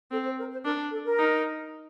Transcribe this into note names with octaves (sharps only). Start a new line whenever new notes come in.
C4 A4
C5
A#4
C5
D4 A#4
A4
A#4
D#4